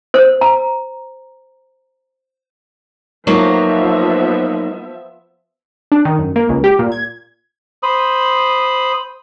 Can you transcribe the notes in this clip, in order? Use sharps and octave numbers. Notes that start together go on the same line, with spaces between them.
C5
A#5
F3 F#3 A#3 B3 D#4 E5
D4
D#3
F#2
A#3
C#2
G4
A#2
G#6
C5 B5 D#6